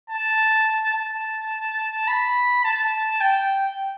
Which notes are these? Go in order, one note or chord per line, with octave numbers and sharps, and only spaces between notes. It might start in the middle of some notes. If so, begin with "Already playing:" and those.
A5
A5
B5
A5
G5